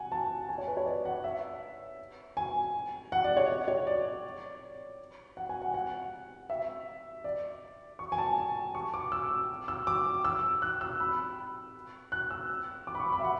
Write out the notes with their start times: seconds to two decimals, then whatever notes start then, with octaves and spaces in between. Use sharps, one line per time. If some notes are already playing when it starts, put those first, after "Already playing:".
Already playing: F#5 G#5
0.12 A5
0.49 G#5
0.58 C#5
0.67 B4
0.77 C#5
0.86 D5
1.05 F#5
1.24 E5
2.37 G#5
3.12 F#5
3.24 D5
3.37 C#5
3.68 C#5
3.87 D5
5.37 F#5
5.49 G#5
5.62 F#5
5.74 F#5
6.50 E5
7.24 D5
7.99 C#6
8.12 G#5
8.18 A5
8.75 C#6
8.94 D6
9.12 E6
9.68 E6
9.87 D6
10.25 E6
10.62 F#6
10.81 E6
11.00 B5
12.12 F#6
12.31 E6
12.87 D6
12.95 B5
13.00 C#6
13.13 B5
13.20 E5
13.24 F#5